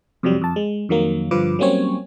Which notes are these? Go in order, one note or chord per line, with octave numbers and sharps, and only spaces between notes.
F2 C3 F#3 G3
F2 A5
G#3
F2 D#3 F#3 A#3
G2 D3 F3 F4 B4 D6
F#3 G3 A#3 C4 C#4 C#5